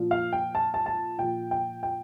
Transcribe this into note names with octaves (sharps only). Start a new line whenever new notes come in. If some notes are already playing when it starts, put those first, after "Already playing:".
Already playing: A#2 F3
F5
G5
A5
A5
A5
A#2 F3 G5
G5
G5